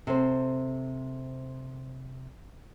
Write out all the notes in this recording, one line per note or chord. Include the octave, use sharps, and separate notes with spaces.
C3 A4 C5